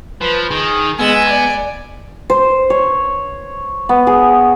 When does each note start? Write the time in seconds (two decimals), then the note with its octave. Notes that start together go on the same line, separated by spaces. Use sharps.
0.21 F3 B4
0.51 D#3 G#4
1.00 G#3 B3 G#5 E6
1.29 D5
2.30 C5
2.70 C#5
3.89 B3
4.07 G#4